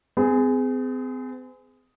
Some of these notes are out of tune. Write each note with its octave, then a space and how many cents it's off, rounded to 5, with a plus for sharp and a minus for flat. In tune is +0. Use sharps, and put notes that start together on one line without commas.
C4 -45 G#4 +0